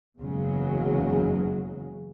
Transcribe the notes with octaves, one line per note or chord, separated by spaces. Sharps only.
F#1 E2 C#3 F#3 G#3